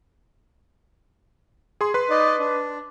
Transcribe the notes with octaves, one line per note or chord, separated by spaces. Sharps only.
G#4 C6
B4 C6
D#4 D5 D#5
D4